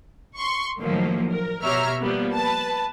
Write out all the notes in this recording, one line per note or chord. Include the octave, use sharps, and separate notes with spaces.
C6 C#6
A2 D#3 F3 F#3 A#3
A#4
B2 G4 C#5 E5 A#5 F6
F3 G3 A#3 B3
B4 A5